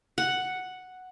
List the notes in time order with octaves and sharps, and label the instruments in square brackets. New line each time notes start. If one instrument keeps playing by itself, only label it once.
[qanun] F#5